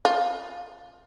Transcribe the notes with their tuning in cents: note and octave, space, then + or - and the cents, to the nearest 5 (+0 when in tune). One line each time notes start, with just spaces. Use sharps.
F4 +10